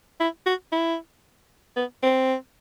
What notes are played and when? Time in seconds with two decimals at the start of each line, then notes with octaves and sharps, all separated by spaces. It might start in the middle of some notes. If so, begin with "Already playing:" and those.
0.20 E4
0.46 F#4
0.72 E4
1.76 B3
2.03 C4